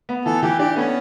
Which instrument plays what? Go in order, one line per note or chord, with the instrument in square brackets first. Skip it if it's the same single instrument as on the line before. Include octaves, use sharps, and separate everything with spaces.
[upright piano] B3
[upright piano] E3 [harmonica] A4
[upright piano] E3 [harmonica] G4
[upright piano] D4 [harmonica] G4
[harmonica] A3 C#4 [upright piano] B3